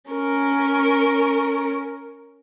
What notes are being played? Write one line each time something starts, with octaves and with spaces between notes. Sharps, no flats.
C#4 A#4